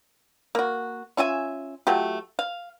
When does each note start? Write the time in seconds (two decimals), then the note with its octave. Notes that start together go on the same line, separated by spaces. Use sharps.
0.55 A#3 F#4
1.17 C#4 F4 E5 G#5
1.87 F#3 A3 F4 G4
2.39 F5